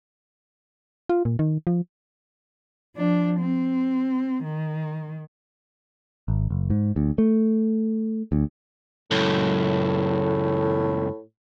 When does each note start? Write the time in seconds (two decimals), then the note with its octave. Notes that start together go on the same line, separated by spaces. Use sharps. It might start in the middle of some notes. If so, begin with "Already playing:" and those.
1.09 F4
1.25 A#2
1.39 D#3
1.67 F3
2.96 F3 D4
3.39 C4
4.43 D#3
6.28 G#1
6.50 F#1
6.70 G#2
6.96 D2
7.18 A3
8.32 D2
9.11 C#2 F#2 A2